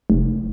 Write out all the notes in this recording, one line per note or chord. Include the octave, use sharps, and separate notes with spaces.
F1